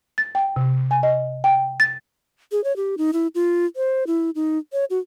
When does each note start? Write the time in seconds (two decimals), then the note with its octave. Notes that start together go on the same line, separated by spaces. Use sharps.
0.18 A6
0.35 G5
0.56 C3
0.91 G#5
1.03 D#5
1.44 G5
1.80 A6
2.52 G#4
2.64 C#5
2.76 G4
2.98 D#4
3.13 E4
3.35 F4
3.76 C5
4.07 E4
4.35 D#4
4.73 C#5
4.90 F#4